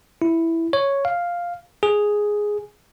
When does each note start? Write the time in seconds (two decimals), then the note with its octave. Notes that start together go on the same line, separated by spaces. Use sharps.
0.22 E4
0.73 C#5
1.05 F5
1.83 G#4